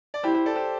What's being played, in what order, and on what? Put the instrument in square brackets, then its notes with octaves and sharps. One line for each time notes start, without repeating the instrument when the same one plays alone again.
[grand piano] D5
[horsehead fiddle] E4 [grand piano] G4 C5
[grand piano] G4 C5
A4 D5
G4 C5